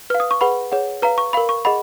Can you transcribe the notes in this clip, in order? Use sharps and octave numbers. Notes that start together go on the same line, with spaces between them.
B4 F5 F6
D#6
C#6
G#4 B4 F#5 B5
G#4 C#5 F#5
B4 F5 A#5
C#6
A#4 F5 B5
C#6
G#4 D#5 F#5 B5